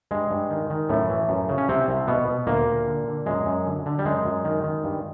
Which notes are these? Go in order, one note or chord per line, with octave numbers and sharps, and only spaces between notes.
G2 G#3
G2
D#3
D#3
F#2 A2 A3
E3
F#2
C#3
C#4
C2 C3 C4
C2
B2 B3
B2
D2 A#2 A#3
D2
D3
D3
F#2 G#3
F#2
D3
D3
G3
F#2 G#3
F#2
D#3
D#3
G2